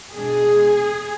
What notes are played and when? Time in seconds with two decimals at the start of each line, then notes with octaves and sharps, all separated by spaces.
0.12 B2 G#3 D4 G#4